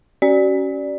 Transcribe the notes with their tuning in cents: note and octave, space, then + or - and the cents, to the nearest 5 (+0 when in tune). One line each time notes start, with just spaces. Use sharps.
C#4 +0 F#4 +40 D5 +0